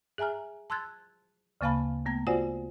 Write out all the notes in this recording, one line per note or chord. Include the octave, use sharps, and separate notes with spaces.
G#4 E5 G#5 A#5 F6
A5 C6 E6 F#6 G#6 A6
D2 C#3 A#3 F5 A5 B5
A3 B3 A#5 G#6
F4 F#4 C5 D5 F#5 G#5